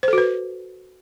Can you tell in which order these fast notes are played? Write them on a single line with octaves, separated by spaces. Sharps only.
C5 A4 F#4 B4